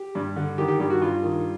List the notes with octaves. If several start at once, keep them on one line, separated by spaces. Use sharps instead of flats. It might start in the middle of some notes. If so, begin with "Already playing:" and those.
Already playing: G4
G2
D3
D#3 G4
G4
G2 G4
F#4
G2 F4
D#3